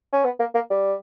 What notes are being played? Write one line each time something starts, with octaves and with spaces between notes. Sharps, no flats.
C#4
B3
A#3
A#3
G3